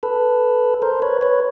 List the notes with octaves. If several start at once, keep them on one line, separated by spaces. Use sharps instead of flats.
A4 B4
A#4 C5
B4 C#5
B4 C#5